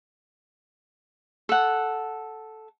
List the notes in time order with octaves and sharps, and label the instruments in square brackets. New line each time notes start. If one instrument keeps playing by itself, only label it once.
[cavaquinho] A4 F#5